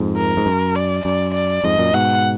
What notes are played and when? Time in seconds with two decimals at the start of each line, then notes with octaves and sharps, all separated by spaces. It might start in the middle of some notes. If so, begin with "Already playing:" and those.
Already playing: F2 G#2
0.17 A#4
0.37 G#2
0.46 F#2
0.76 D5
1.05 F#2 D5
1.34 D5
1.64 F2 G#2 D#5
1.78 F#2 A#2
1.93 G#2 B2 F#5